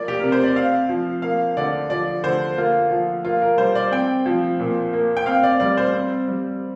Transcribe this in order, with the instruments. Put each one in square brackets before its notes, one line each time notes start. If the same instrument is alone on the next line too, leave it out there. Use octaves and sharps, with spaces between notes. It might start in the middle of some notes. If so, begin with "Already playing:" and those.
Already playing: [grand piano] F3 A#3 D5
G4
C3 A#4
C5
D5
C4 F5
F3
A#3 F5
D3 D5
F3 D5
D3 C5
A#3 F4
F3
A#3 F4
A#4
G3 C5
D5
C4 G5
F3
A#2
A#3
G5
C4 F5
D5
G3 D5
C5
C4
G3